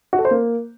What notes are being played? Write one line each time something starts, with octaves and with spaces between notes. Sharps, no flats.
F#4
A4
C5
A#3